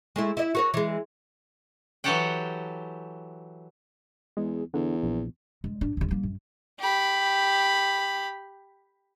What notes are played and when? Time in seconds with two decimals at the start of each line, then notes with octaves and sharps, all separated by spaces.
0.16 G#3 A3 E4
0.37 E4 D#5 E5
0.55 F#4 A#4 C#5
0.74 E3 G#3
2.04 E3 F#3 G4 A4 F#5 G5
4.37 E2 G#3
4.74 E2 D3
5.03 A#1
5.64 G#3
5.81 G#2 D4
5.97 D#2 D3
6.08 G3 A#3
6.23 F#2
6.79 G4 B5